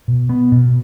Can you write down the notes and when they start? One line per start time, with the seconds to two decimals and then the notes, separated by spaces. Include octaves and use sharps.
0.08 B2
0.29 B3
0.52 B2